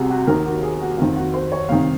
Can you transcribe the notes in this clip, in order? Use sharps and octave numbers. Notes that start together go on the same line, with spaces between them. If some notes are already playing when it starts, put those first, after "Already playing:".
Already playing: C2 C3 F#4 G#4
F#4
D#2 D#3 A#4
F#4
G#4
F#4
F2 D#3 F4
F#4
C5
C#5
C2 C3 D#3 F5